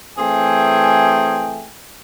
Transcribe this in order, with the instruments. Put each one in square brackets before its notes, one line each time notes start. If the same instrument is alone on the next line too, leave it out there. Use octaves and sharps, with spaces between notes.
[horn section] E3 A3 C4 G#4 G5 G#5